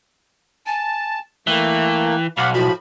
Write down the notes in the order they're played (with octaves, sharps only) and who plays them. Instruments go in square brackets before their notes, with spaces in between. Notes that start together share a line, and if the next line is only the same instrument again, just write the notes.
[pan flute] G#5 [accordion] A5
[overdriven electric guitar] E3 [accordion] A3 A#3 [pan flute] G5
[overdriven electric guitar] B1 [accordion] F5 F#5 B5 [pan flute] D6
[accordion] A2 F3 B5 [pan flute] F#4